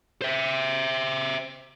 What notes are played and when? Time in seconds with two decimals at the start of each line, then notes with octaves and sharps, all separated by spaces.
0.22 C5 E5